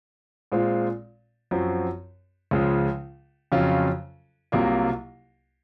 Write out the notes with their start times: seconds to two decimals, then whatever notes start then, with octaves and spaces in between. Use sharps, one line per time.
0.52 A#2 G#3 C4 F4
1.51 F#2 F3 C4 F#4
2.51 C#2 C#3 F3 G#3
3.52 F2 C#3 F#3 C#4 F4
4.52 C2 C3 F#3 A#3 F4